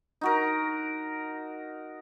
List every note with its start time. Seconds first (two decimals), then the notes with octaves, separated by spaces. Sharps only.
0.21 D#4 F#4 A#4